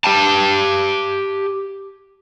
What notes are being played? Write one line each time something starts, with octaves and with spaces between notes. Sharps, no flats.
G4 G5 A5